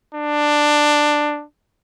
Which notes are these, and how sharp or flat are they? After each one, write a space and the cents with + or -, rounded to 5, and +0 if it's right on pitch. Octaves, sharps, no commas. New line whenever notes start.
D4 +10